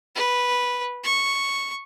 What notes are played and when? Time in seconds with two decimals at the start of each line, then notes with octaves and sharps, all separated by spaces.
0.16 B4
1.04 C#6